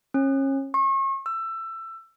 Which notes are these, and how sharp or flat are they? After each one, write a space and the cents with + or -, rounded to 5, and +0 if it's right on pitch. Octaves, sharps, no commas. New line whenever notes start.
C#4 -30
C#6 -40
E6 +20